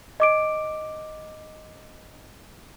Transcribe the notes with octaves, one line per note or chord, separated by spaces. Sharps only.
D#5 D6 D7